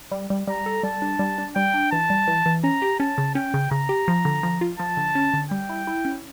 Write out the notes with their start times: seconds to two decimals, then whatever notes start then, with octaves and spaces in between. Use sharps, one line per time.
0.12 G3
0.30 G3
0.47 G3 A#5
0.66 A4
0.83 G3 A5
1.02 D4
1.19 G3
1.38 D4
1.56 G3 G5
1.74 D4
1.92 E3 A5
2.10 G3
2.27 E3
2.46 E3
2.64 C#4 A#5
2.82 G4
3.00 C#4 A5
3.18 C#3
3.35 C#4 G5
3.54 C#3
3.71 C#3 A#5
3.89 G4
4.08 F3
4.25 D3
4.43 F3
4.61 F4
4.79 F3 A5
4.97 D3
5.15 C#4
5.34 D3
5.51 G3 G5
5.70 E4
5.87 E4
6.05 C#4